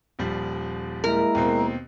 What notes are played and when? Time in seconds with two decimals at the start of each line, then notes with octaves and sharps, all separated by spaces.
0.19 D#1 F3 G3
1.04 G#3 A#3 E4 A#4
1.35 D#2 B2 C4